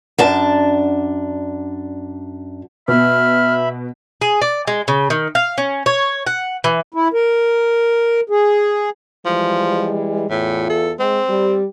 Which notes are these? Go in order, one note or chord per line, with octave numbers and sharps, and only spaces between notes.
F#2 D4 A5
B2 E5 B5 F6
G#4
D5
G#3
C#3
D#3
F5
C#4
C#5
F#5
E3
E4
A#4
G#4
E3 F3 G3 G#3
E2 A2 E3 F4
A4
G#3 C4
G3 G4